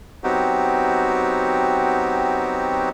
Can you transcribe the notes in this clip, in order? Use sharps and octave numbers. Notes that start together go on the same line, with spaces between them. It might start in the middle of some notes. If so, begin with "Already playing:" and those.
F#3 B3 C4 D#4 F#4 G4